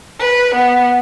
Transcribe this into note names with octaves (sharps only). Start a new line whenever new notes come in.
B4
B3